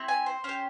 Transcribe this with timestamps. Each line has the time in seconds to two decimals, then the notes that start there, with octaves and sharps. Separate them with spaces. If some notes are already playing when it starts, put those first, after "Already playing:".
Already playing: C4 E4 G4
0.08 G#5
0.26 C5
0.44 C#4 G4 C5